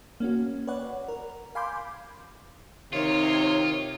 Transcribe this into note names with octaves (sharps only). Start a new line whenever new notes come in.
A#3 C#4 F#4
B4 C#5 D5 F#5
A#4
F5 G#5 B5 C6 D6 G6
C3 D#3 F4 C#5